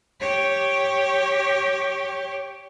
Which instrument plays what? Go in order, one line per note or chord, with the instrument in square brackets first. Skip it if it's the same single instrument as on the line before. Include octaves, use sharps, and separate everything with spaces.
[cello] G4 C#5